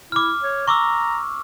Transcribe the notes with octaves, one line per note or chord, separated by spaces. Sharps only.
E4 D6 F6
C#5
A#5 C#6 D6 E6